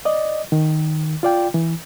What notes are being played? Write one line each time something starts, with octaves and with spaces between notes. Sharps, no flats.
D5 D#5
D#3
F4 D5 G5
E3